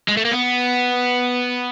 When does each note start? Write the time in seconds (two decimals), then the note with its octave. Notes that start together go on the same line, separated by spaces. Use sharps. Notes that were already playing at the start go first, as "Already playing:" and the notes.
0.08 G#3
0.17 A3
0.25 A#3
0.31 B3